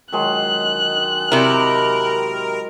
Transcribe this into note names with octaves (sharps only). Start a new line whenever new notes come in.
D#3 F#3 G#3 F#6
C3 E4 A#4